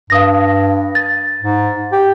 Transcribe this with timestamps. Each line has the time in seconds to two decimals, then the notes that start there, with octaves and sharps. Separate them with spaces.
0.10 G2 F5 D#6 A#6
0.95 A6
1.42 G#2
1.93 G4